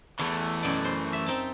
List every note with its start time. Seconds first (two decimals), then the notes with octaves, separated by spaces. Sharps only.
0.19 E2 E3 A3
0.63 F#2 B2 D5
0.84 C5
1.13 E5
1.26 C4 D#4 A5